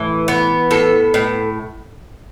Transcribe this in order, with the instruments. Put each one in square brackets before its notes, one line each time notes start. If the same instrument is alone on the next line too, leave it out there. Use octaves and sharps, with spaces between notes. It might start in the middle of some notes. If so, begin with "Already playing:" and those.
Already playing: [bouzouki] A2 E3
B3
A2 A4
A2